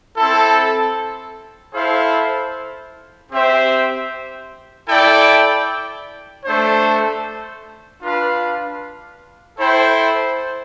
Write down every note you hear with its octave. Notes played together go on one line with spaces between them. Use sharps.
C4 E4 A4
E4 A4 C5 F5
C4 G4 C5 E5
E4 A4 D5 G5
A3 D4 A4 C5
D4 F4 B4 F5
E4 A4 C5 G5